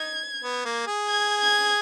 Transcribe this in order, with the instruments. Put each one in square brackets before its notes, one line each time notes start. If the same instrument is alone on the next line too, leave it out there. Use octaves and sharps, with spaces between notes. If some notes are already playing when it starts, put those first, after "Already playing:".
Already playing: [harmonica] D#4 [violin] G#6
[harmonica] B3
A#3
G#4
[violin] G#6
G#6